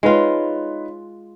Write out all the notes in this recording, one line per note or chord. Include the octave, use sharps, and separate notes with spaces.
G#3 D#4 F4 B4 C#5